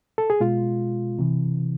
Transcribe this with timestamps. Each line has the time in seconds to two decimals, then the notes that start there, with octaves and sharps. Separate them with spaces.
0.18 A4
0.30 G#4
0.40 B2 G#3 F4
1.19 C3 E3